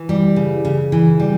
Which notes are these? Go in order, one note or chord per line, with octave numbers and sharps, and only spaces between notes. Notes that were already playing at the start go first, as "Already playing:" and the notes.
Already playing: E3
G3
C#3
C#3
E3
G3